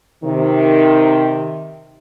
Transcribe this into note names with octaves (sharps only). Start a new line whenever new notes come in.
C3 D#3